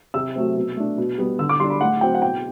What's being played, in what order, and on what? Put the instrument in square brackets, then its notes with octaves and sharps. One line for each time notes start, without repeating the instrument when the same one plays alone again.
[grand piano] C3 E6
F#3 A3 C4
B2
A3 D4
B2
G3 B3
D3 E6
D6
G3 D4 C6
B5
A2 F#5
F#3 C4 G5
F#5
B2 G5